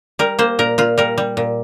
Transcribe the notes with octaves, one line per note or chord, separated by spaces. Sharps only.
G3 A#4
A#3 C5
A#2 A#4
A#2 F4
G3 A#4
G3
A#2